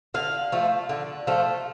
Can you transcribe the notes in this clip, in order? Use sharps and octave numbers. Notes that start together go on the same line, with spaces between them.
D3 F5
F3 A3
D3
F3 A3